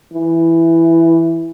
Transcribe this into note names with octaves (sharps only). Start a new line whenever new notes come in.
E3